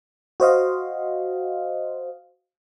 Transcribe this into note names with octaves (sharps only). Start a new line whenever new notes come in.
F#4 C5 D#5 F5